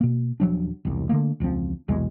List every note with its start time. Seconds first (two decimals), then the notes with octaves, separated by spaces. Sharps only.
0.01 B2 A#3
0.40 D#1 F3 F#3 D4
0.85 E1 C2
1.09 D3 F3 A3 A#3
1.40 E1 C#2 F3 C4
1.88 B1 E2 C3 G#3